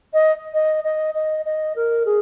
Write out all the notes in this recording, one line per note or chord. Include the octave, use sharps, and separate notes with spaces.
D#5
D#5
D#5
D#5
D#5
A#4
G#4